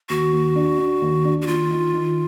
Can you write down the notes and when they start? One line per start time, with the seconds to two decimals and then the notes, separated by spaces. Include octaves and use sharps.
0.09 D#2 F#4
0.33 D#2
0.56 D4
0.79 D4
1.02 D#2
1.25 D4
1.42 F#4
1.47 D#2 F4
1.71 D#3
1.94 D#3